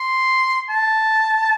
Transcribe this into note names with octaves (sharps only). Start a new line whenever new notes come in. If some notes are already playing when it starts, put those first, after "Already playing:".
Already playing: C6
A5